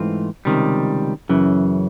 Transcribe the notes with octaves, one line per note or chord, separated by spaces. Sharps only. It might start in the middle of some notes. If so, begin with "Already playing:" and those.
Already playing: G#2 E3 A3 C4 F4
C#2 C3 D#3 G3
F#2 C#3 E3